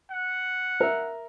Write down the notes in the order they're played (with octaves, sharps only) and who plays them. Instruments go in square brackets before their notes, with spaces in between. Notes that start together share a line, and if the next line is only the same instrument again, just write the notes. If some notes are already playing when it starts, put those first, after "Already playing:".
[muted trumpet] F#5
[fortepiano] A#4 E5